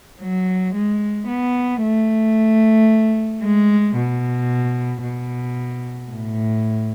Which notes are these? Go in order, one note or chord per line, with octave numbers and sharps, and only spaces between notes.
F#3
G#3
B3
A3
G#3
B2
B2
A2